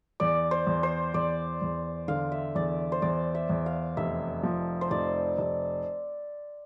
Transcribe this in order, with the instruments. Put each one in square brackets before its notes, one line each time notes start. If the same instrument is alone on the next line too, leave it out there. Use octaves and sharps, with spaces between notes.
[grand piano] E2 [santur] D5
[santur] C5
[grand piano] E2
[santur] C5
[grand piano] E2 [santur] D5
[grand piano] E2
[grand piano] D3 [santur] F5
[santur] E5
[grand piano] E2 [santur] D5
[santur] C5
[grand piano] E2 [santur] D5
[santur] E5
[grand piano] E2
[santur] F5
[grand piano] F1 [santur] E5
[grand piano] F3
[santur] C5
[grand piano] F1 [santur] D5
[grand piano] F1